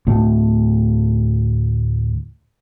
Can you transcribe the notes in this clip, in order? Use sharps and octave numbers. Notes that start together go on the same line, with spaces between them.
D2 A2 A3